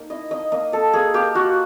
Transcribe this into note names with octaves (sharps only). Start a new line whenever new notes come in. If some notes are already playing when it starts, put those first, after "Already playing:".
Already playing: A#3 D#4
E4 D#5
A#3 D#5
A#3 D#5
A#3 A4
A#3 G#4
A#3 G4
F4 F#4